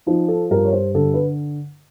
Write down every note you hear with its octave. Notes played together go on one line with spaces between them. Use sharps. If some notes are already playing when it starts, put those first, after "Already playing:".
F3 D#4
A4
G2 A#4
C#5
C5
D3 A4
B4